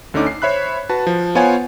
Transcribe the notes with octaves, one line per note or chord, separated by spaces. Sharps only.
D2 D3 C#4 D#4 D6
C7
C5 C#5 E5 B5 F#6
F#4 B4 A5
F3
B3 F4 C5 C#5 F#5 G#5